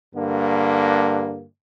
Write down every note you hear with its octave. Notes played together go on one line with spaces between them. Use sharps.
G2 D3 A#3